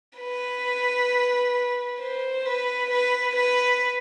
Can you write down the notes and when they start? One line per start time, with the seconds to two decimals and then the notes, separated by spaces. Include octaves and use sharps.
0.18 B4
2.00 C5
2.45 B4
2.90 B4
3.36 B4